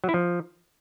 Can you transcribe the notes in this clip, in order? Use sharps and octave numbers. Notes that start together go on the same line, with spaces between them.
F#3
E4
F3